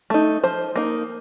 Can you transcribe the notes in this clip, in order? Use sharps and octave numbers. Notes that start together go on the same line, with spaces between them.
A3 D#4
F3 C5
A#3 D#4